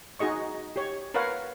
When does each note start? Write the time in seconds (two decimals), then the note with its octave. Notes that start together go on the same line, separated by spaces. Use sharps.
0.19 D#4 F#4 G#4 D#5 C#6
0.76 G4 C#5
1.14 A#4 B4 C#5 F5 F#5